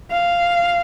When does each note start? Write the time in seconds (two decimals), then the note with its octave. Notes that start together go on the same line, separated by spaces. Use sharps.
0.11 F5